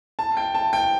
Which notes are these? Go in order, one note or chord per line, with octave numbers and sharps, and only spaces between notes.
A5
G5
A5
G5